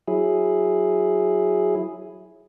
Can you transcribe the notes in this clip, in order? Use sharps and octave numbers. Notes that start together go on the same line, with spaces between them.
F#3 E4 G#4